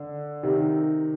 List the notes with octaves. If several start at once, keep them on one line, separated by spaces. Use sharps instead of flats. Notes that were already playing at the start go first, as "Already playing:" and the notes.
Already playing: D3
C3 D#3